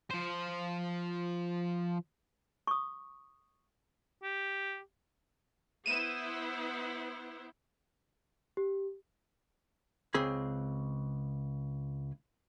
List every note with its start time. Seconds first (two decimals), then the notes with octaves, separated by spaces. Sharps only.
0.11 F3 C5
2.67 C#6 D#6
4.23 G4
5.86 B3 E4 C5 D#7 E7
8.57 G4
10.14 C#2 C4 G#4 B5